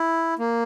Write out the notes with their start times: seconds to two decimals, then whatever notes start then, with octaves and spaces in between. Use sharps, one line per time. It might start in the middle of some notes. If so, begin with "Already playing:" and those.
Already playing: E4
0.39 A#3